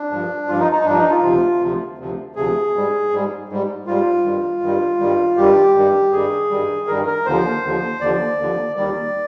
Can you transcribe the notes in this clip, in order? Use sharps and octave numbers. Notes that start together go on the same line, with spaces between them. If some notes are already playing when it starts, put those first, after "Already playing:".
Already playing: D4
G2 F3
G2 F3 F4
D#4
D#4
G2 F3 D4
D#4
F4
D2 C3 F3
D2 C3 F3
D2 C3 F3
D2 C3 F3 G#4
G#2 G3
G#2 G3
G#2 G3
G#2 G3 F4
G2 D#3 G3
G2 D#3 G3
G2 D#3 G3
G2 D#3 G3 G4
G2 D#3 G3
G2 D#3 G3 G#4
G2 D#3 G3
G2 D#3 G3 A#4
A#4
D#2 D3 F3 C5
D#2 D3 F3
D#2 D3 F3 D5
D#2 D3 F3
D#2 D#3 G3 D5